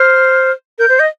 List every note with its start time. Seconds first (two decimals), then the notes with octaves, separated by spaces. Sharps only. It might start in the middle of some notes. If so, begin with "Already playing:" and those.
Already playing: C5 F6
0.79 A#4 G6
0.89 C5
1.00 D#5